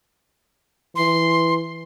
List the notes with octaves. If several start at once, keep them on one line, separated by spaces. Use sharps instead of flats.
E3 C6